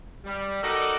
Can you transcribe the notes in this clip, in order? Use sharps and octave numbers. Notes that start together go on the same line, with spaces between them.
G3
D#4 F#4 A4 A#4 D5 D#5